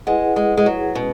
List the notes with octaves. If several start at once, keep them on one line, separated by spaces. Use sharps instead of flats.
G#3 E4 G#4 B4 F#5
G#3
G#3
F#3
B2 G#3 C#4 F#4 B4